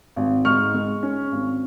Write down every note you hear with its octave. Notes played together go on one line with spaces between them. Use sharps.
G#1
G#2 C#6 F6
G#3
C#4
G#1